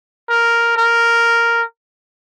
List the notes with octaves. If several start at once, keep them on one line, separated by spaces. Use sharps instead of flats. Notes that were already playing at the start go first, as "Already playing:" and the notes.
A#4
A#4